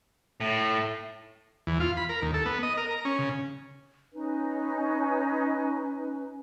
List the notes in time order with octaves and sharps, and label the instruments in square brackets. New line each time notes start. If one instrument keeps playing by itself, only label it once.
[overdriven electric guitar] A2
[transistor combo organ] E2
F4
B5
A#4
D#2
A4
B3
D#5
A#4
A#5
C#4
C#3
[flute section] C#4 D#4 B4